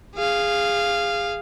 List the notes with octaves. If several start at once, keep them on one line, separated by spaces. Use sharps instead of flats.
G#4 F5